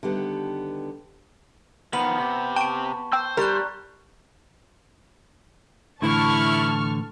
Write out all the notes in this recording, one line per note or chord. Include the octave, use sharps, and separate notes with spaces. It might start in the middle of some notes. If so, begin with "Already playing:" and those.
D3 D#3 G3 B3 G4 A4
D#3 F3 B3 F#7
C3 G4
G5 A5 C#6 D7
C5 G5 E6
G3 A#4 A#5 C#6 F#6
A2 D3 E3 A3 E4 A5 C#6 F6